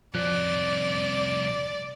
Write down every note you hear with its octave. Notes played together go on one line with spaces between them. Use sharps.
C2 F2 F3 D5 F#6